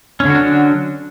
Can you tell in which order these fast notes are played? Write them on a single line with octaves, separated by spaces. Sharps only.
C#4 D3 F#4 D4 F#3